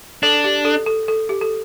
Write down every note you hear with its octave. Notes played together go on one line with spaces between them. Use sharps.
D4 A4
G4
A4
A4
A4
G4
A4